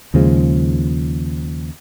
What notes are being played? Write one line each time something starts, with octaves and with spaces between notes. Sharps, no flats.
D#2 C#3 F3 G#3